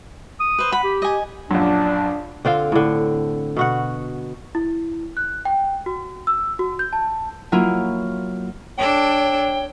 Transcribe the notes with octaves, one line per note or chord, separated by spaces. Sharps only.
D#6
B4 C5
F#5 B5
G4
D#5 G#5
A#1 F#2 D4
D3 C4 F4 F5
A2 D3
B2 F#4 F#5
E4
F#6
G5
F#4
E6
F#4
G6
A5
F#3 A#3 E4 F4
D4 A4 C#5 G5